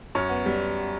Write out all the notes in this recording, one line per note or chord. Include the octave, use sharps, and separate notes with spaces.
F#2 C#5
B3
G3